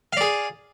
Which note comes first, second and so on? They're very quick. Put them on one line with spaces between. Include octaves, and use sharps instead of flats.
F5 D5 G#4